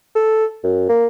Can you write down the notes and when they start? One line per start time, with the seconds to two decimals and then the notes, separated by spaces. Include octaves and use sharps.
0.15 A4
0.64 F#2
0.89 A#3